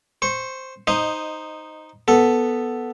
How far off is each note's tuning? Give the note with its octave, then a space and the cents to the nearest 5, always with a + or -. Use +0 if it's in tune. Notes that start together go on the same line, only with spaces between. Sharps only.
C5 +0 C#6 -15
D#4 +0 C5 +0 D#5 -10
B3 +0 A4 +0